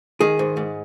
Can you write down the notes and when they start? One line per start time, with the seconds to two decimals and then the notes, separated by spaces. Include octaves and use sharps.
0.20 D#3 G#4
0.39 G#2
0.57 G#2